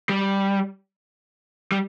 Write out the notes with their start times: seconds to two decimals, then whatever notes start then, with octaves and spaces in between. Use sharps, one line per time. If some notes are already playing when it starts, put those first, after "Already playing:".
0.09 G3
1.72 G3